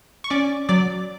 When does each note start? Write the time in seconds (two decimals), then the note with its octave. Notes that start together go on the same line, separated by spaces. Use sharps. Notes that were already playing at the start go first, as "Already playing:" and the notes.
0.24 C#6
0.30 C#4 D5 D6
0.69 F#3 D5 D6